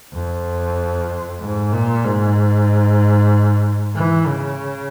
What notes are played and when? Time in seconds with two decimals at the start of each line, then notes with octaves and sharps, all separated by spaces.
0.14 F2
1.41 G#2
1.73 A#2
2.04 G#2
3.96 E3
4.27 C#3